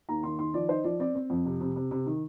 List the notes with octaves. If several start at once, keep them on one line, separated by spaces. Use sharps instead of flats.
D#2 A#5
D#3 C6
D#3 C6
F3 D5
D#4 C5
F3 D5
C4 D5
C4
F2
C3
C3
C3
C3
D#3